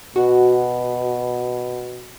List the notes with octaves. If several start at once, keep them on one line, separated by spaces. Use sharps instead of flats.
B2 F#4